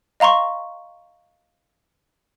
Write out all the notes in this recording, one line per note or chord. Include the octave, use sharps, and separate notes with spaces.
D#5 F5 A#5 C6 C#6